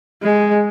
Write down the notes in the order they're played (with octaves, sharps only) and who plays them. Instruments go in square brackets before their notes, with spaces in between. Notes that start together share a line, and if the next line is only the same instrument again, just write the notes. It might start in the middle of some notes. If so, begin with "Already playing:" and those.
[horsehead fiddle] G#3